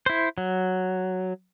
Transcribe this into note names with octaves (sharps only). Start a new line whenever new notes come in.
E4 C5
F#3